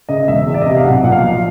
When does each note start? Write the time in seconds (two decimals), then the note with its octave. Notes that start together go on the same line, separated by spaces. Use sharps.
0.09 C#3 D#5
0.22 D#5
0.28 E1 E5
0.46 E2
0.54 D5
0.62 D#5
0.66 C3 E5
0.77 F5
0.84 B1 F#5
1.03 A#2 F#5
1.12 F5
1.21 F3